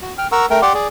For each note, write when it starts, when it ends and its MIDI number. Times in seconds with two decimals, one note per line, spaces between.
0.02 0.13 66
0.18 0.27 79
0.18 0.27 89
0.32 0.46 70
0.32 0.46 78
0.32 0.46 82
0.32 0.46 85
0.32 0.46 88
0.50 0.61 57
0.50 0.61 70
0.50 0.61 79
0.62 0.73 67
0.62 0.73 74
0.62 0.73 78
0.62 0.73 79
0.62 0.73 84
0.62 0.73 86
0.74 0.88 68
0.74 0.88 74